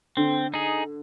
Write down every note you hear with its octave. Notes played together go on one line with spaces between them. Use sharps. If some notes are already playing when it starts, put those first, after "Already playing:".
D3 C4
D#4 G#4